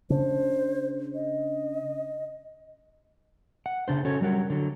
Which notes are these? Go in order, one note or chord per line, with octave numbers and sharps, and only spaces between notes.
C#3 D4 C5
D#5
F#5
C#3 D4 C5
C#4 F#4 A4 C#5
F#3 G3 A#4 F#5
D3 F#3